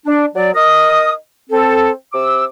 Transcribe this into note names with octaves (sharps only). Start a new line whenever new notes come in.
D4
F#3 D5
D#4 A#4 D#6
C4 A4
C3 D6 E6